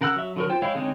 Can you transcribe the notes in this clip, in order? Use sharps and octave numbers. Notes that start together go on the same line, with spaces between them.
C#3 A#4 F#5 E6 F#6
F#3 E5
D3 F#3 A#4
F4 C5 G5
G#3 E4 C#5 F5 G5
D3 G#3 C4 D#4 C#5